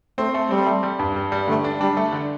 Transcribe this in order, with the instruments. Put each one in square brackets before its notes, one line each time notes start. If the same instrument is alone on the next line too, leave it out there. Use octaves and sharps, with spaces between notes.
[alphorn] A3 [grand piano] C4
[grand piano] A3
[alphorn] G3 [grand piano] C4
[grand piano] A3
G3
G2
G3
G3
[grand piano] D3 [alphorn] A3
[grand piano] D4
[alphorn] G3 [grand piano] D4
[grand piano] A3
D3